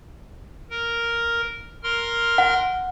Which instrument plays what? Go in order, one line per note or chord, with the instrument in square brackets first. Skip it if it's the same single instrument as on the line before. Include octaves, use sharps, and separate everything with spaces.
[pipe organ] A#4
A#4 C6 F6
[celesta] F#5